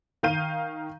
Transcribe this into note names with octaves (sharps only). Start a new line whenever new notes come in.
D#3 F5 G6 D#7